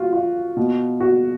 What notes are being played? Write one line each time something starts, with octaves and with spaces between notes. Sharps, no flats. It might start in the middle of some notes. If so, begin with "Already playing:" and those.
Already playing: F4 F#4
F4
B2
F#4